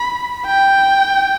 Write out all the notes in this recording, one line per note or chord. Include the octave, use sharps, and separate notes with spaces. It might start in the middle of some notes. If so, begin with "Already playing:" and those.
Already playing: B5
G5